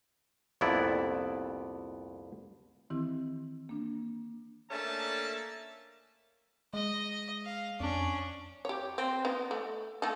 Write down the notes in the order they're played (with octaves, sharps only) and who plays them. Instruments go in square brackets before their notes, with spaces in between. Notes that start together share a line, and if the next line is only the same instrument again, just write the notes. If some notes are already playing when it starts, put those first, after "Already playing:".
[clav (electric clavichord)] C2 F2 A#2 B3 E4 D5
[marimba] D#3 E3 C4 E4 G4
A#3 D4
[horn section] A3 A#3 C#4 D4 E5 A5
[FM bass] G#3 [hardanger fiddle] D#5
[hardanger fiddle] F5
[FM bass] F2 [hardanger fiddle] C#4 D4
[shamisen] G4 C#5
C4
B3 D#4
A3
A3 D#4 A4